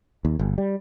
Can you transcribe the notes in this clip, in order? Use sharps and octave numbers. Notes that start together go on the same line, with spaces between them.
D#2
G1
G3